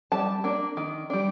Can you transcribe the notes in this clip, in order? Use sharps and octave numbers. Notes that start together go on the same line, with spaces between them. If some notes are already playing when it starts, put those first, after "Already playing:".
G3 A5
A#3 D4
D#3
G3 D4